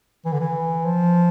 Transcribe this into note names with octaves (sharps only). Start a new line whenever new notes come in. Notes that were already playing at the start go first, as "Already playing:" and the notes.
E3
D3
E3
F3